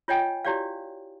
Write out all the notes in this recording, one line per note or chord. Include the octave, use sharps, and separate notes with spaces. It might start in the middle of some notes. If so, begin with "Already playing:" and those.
F4 C#5 D#5 G5 G#5
E4 F#4 G4 C#5 D5 F5